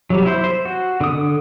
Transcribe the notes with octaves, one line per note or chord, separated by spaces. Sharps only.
F#3 G3
E4 C5
C5
F#4
D3 D#6